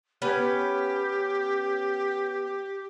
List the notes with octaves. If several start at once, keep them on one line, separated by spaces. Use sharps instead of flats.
B3 C#4 G4 B4